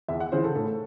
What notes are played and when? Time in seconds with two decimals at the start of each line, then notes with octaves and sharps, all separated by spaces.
0.08 E2 E5
0.20 F#5
0.32 C#3 E3 C5
0.44 A4
0.55 A2 A4